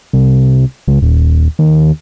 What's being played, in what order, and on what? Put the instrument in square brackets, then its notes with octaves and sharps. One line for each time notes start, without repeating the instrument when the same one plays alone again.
[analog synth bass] C2
C#2
D#1
D#2